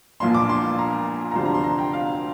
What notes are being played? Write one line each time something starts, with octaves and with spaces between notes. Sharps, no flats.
A#1 A#2 A#3 D4 C6
D6
C6
A#5
A#5
D2 C3 F3 D4 C6
A#5
C6
A#5
G5
F5